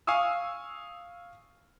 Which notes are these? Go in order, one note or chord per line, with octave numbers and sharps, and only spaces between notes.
F5 G#5 C#6 D#6 E6